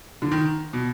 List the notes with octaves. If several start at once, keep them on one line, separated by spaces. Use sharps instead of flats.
D3
D#3
B2